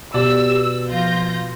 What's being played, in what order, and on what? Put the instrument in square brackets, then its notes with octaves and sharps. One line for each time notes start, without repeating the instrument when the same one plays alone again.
[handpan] B2 [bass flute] G4 [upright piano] D5 [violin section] E6
[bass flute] F3 [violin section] F4 G6 A#6